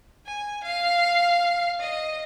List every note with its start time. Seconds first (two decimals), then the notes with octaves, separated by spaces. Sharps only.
0.26 G#5
0.64 F5
1.80 D#5